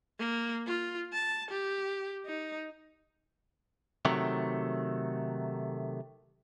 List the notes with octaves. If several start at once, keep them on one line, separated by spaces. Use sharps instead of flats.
A#3
F4
A5
G4
D#4
C3 D#3 F#3 A3